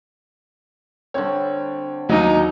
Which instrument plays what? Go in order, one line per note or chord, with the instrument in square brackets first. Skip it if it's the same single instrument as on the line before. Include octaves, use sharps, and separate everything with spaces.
[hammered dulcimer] D3 G3 C4 [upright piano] C#5
[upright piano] D#2 F#3 [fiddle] D#4 [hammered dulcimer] D6